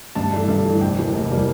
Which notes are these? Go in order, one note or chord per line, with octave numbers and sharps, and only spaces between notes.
G2 A5
E3 A3 D4
G2
E3 A3 D4
F1 G5
E2 E3 G3 A#3
F1
E3 G3 A#3